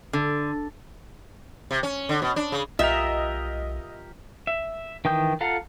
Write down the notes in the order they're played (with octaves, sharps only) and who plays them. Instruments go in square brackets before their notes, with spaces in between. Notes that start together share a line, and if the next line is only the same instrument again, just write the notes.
[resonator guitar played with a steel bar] D3
[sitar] C3
C#4
D3
B2
D4
C#3
[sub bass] B1 [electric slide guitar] F4 G4 A#4 [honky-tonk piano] D#5 [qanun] E5
[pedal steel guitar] E5
D#3 E3 G5 D#6 G6
F4 A4 F5 F#5 A#5